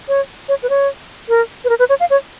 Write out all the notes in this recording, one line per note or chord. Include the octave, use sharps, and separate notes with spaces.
C#5
C#5
B4
C#5
A#4
B4
A#4
B4
C#5
F5
C#5